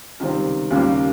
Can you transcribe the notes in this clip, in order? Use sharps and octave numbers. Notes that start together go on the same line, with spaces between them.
C#2 C3 D#3 G3 C4
D#2 C#3 G3 A#3